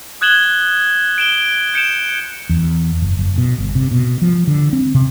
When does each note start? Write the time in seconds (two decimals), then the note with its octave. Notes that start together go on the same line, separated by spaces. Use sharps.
0.21 D#6 F#6 G#6 E7 F#7 G7
1.18 D7 E7 G7
1.74 G6 C#7 D7 E7
2.49 E2
3.02 F#1
3.19 F#1
3.38 B2
3.58 G1
3.75 C3
3.91 B2
4.22 F3
4.47 D3
4.73 C4
4.95 C3